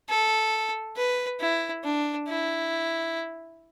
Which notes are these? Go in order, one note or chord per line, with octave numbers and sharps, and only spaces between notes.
A4
B4
E4
D4
E4